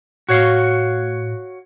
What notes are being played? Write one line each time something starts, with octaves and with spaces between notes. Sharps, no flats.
A2 F#4 C#5 F5